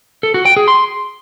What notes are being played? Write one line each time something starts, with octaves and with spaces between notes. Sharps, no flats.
A4
F#4
G5
G#4
C6